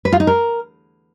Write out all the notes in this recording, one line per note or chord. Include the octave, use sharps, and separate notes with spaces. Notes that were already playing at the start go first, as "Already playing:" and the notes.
B4
F4
D#4
A#4